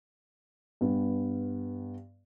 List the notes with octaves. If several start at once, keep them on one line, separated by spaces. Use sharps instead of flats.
G2 B3